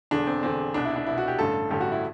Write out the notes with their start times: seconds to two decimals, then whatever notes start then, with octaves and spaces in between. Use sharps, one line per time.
0.11 E1 E2 D3 D4
0.27 C4
0.43 E1 E2 D3 C4
0.74 C2 B2 D4
0.85 E4
0.96 D4
1.06 C2 B2 E4
1.18 F#4
1.28 G4
1.39 A1 G2 D3 A4
1.70 A1 G2 D3 G4
1.81 F#4
1.92 E4